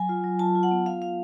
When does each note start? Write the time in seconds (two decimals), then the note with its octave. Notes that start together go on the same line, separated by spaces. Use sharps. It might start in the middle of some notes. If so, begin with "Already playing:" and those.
Already playing: F#3 G#5
0.09 F4
0.24 F#3
0.39 F4 A5
0.55 F4
0.63 F#5
0.71 B3
0.86 F4 F5
1.02 F4 F5